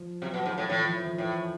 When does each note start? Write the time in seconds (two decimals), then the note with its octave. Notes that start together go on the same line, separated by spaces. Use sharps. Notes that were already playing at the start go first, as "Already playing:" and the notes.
Already playing: F3
0.21 C3 F#3
0.34 B2
0.46 G#2
0.58 A2
0.70 A2 F3
0.82 F3
0.94 E3
1.06 F3
1.18 A2 E3